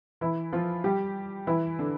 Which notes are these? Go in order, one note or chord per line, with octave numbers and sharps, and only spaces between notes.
E3 E4
F3 F4
G3 G4
E3 E4
D3 D4